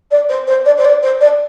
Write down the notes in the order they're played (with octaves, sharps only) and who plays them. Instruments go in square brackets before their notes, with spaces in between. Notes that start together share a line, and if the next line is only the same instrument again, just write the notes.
[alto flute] D5
C5
C5
D5
C5
D5
C5
D5